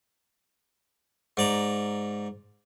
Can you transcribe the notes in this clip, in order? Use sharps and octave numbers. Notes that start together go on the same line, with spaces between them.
G#2 D5 A#5